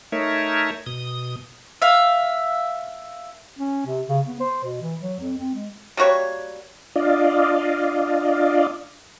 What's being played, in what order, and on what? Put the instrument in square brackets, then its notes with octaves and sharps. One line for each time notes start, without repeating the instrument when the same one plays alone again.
[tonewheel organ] A3 D#4 A#4 C#5 E5
B2 D#6
[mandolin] E5 F5
[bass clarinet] C#4
C3
C#3
B3
C5
B2
E3
F#3
F2
C4
G#3
[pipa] G3 A#3 F#4 C#5
[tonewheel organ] D4 F4 D5 D#5 F5